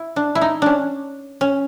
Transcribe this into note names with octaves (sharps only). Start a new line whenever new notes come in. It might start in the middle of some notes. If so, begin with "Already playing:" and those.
Already playing: E4
D4
E4
D#4
C#4 D4
C#4